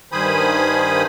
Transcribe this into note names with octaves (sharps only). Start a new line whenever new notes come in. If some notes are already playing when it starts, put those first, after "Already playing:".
G2 D#3 C5 G#5 B5 D#6